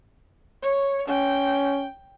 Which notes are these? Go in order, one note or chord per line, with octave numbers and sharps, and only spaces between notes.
C#5
C#4 G5